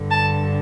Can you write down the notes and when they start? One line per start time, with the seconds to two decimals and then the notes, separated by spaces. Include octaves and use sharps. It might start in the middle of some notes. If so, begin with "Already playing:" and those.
Already playing: G2 D3
0.11 A5